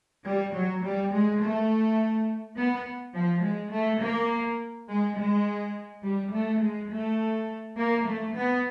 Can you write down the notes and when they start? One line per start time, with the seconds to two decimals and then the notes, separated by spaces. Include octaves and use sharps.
0.24 G3
0.53 F#3
0.82 G3
1.11 G#3
1.39 A3
2.56 B3
3.13 F3
3.42 G#3
3.71 A3
4.00 A#3
4.88 G#3
5.16 G#3
6.03 G3
6.32 A3
6.61 G#3
6.90 A3
7.77 A#3
8.05 A3
8.35 B3